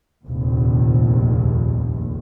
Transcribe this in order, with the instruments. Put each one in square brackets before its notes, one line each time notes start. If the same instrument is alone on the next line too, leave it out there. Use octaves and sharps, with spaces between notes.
[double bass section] F1 A#1 D#2